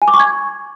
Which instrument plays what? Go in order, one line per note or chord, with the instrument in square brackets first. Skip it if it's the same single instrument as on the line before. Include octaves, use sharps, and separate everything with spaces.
[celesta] G#5
D6
C#6
G#6